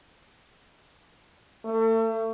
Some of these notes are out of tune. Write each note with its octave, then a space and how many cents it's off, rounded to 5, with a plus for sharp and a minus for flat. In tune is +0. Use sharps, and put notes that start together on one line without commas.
A3 +35